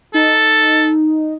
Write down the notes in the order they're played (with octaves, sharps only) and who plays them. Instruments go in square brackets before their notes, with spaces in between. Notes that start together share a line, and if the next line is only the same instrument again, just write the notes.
[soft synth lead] D#4 [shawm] A4